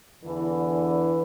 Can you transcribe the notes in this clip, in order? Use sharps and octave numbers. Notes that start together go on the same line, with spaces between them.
E2 D3 E3